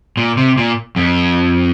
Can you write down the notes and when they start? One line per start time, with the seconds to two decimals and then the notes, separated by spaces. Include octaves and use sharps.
0.17 A#2
0.37 C3
0.58 A#2
0.96 F2